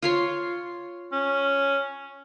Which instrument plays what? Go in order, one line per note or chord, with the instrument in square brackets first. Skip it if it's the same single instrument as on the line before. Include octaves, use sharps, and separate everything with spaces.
[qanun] F4 C#5 C6
[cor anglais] C#4